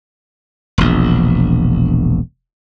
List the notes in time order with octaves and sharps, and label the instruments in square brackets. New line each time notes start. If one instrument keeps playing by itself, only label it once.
[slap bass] E1 A#1